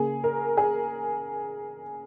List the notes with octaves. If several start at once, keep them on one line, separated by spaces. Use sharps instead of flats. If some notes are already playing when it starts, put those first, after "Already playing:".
Already playing: C#3 A#3 G#4
A#4
G#4